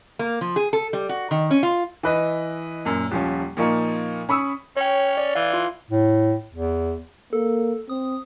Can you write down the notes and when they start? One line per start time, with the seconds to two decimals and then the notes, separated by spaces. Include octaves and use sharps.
0.19 A#3
0.41 F3
0.56 G#4
0.73 A4
0.93 G3
1.09 F#4
1.31 D#3
1.51 C#4
1.63 F4
2.03 E3 B4 D#5
2.85 F#2 A#2
3.11 D#1 F3 C#4
3.57 A#2 F3 A#3 D#4 C#6
4.29 C#4 B5 C#6 D#6 E6
4.77 C#4 C#5 G5
5.17 D5
5.35 E3 F5
5.53 F4
5.91 A2
6.53 E2
7.33 A#3 A4
7.89 C4 D#6